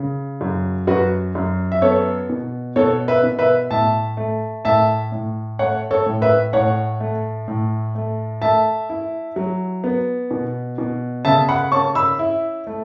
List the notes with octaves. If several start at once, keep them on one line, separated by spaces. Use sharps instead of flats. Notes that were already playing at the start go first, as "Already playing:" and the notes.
Already playing: C#3
F#2
F#2 F#4 B4
F#2
E5
B3 A4 C#5
B2
B2 A4 C#5
B4 E5
B2
B4 E5
A2 E5 A5
A3
A2 E5 A5
A2
A3 C#5 F#5
A4 C#5
A2
B4 E5
A2 C#5 F#5
A3
A2
A3
A3 E5 A5
E4
F#3
B3
B2
B2
C#3 E5 A5
F#5 B5
C#4 A5 C#6
B5 E6
E4
A3